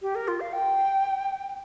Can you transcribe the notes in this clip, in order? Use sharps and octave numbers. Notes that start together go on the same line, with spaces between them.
G4
A#4
F4
F5
G5